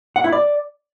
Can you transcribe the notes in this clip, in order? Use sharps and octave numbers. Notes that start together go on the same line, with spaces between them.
F#5
E4
D5